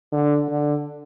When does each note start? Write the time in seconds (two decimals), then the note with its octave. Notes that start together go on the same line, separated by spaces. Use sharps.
0.12 D3
0.49 D3